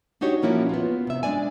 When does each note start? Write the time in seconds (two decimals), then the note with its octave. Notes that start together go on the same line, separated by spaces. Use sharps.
0.21 D4 D#4 F#4 G4 C#5
0.42 A#2 F3 A#3 C#4 E4 F#4
0.69 B3 F4
1.07 C3 E5
1.23 G#3 D4 D5 G#5